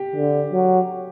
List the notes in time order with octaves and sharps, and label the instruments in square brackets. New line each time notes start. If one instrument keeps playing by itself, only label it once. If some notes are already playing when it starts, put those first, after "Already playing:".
Already playing: [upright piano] G4
[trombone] D3
F#3